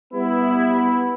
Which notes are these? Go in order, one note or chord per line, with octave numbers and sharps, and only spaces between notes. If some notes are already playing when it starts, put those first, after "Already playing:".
G3 B3 E4